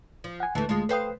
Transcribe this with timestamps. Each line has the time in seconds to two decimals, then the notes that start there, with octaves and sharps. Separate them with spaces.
0.24 F3
0.40 F#5 G#5
0.55 D2 E3 A3 A5
0.69 G#3 F4
0.89 A4 B4 C5 F5 G5 D#6